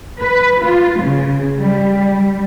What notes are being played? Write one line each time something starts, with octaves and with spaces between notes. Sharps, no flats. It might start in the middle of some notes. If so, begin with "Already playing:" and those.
B4
F4
C#3
G3